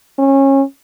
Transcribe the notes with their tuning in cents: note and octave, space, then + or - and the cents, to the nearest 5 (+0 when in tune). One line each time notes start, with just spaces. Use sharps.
C#4 -25